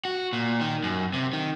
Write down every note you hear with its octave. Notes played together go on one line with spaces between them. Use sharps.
F#4
A#2
D#3
F#2
C3
D#3